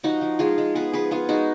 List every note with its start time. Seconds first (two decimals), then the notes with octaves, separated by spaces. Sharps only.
0.03 F3 D#4 F#4
0.21 F3
0.39 G#3 F4 G#4
0.58 G#3
0.75 B3 G#4 B4
0.93 F3 G#4 B4
1.11 B3 F4 G#4
1.29 G#3 D#4 F#4